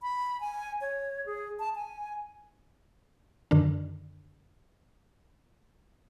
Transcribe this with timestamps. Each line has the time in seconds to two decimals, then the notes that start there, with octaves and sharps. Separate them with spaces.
0.02 B5
0.40 G#5
0.81 C#5
1.26 G#4
1.59 A5
1.75 G#5
3.51 F#2 D3 D#3 D4